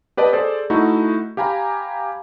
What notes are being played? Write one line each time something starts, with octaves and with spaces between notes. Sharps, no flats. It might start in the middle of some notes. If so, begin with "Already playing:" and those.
G4 B4 D5 D#5 A5
G#4 A4 C5 D5
A3 D#4 E4 F#4
G4 F5 G#5 A#5 B5